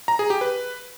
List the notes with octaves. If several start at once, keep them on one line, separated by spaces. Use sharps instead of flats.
A#5
G#4
G4
B4